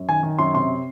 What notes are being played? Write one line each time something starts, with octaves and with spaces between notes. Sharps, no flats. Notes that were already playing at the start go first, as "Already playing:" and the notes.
Already playing: F#2
D#3 G#5
D#3
F#2 C6
C3 C6